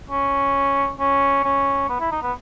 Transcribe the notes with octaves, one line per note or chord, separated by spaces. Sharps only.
C#4
C#4
C#4
B3
E4
D#4
B3